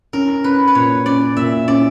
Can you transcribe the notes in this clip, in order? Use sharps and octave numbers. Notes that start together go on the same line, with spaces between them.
C#4 A#4
C#4 B4
B4
A#2 C#5
C#4 D5
A#2 E5
C#4 D5